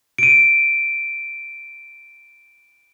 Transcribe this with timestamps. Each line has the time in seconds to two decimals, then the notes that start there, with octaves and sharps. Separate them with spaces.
0.18 D7 D#7